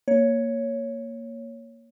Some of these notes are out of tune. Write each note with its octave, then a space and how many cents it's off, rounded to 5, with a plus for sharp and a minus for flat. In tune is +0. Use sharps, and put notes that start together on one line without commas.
A#3 +0 C#5 +5